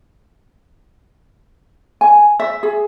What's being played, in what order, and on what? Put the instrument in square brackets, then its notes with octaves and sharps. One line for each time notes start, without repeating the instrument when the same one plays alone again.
[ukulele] G#5
E5
G#4